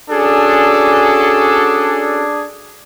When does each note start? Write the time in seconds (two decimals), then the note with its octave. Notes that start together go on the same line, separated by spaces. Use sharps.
0.10 C#4 D4 F#4 G#4 A4